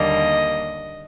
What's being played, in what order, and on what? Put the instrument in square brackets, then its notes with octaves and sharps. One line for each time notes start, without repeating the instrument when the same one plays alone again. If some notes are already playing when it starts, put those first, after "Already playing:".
Already playing: [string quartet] D#2 D3 G3 A#3 D#5